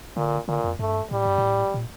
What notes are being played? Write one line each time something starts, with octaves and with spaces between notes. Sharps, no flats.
A#2 D3
A#2 D3
F2
G2 A3
A2 G3
G2
A2
A#2